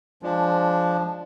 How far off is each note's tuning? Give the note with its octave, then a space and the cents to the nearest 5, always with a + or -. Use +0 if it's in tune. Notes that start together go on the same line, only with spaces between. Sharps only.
F3 +0 G#3 -10 D4 +0